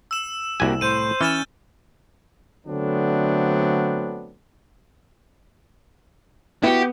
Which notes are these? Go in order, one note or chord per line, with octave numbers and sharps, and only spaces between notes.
E6 E7
C2 A#3 F#4 G4 G#5
A2 C5 G6 D#7
E3 C#4 F6 A6 E7
D3 F#3 A3 B3 C4 D4
B3 E4 F#4 G4